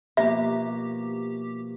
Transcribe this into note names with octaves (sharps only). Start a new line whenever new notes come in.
B2 F3 A#3 G4 E5